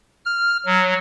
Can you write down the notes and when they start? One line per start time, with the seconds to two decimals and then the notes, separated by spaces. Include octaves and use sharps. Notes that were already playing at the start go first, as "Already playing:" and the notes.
0.25 F6
0.66 F#3